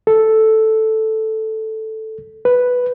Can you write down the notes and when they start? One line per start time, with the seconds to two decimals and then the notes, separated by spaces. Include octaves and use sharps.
0.07 A4
2.45 B4